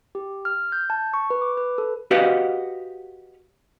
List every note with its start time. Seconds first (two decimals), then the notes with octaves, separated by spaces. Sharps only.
0.15 G4
0.45 F6
0.72 G6
0.90 A5
1.14 C#6
1.30 B4
1.42 D6
1.57 B4
1.78 A4
2.11 F#4 G4 B4 D#5 F5 F#5